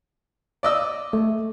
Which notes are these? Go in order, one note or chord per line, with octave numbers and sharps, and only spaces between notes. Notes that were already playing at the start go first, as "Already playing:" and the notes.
D5 D#5 E6
A3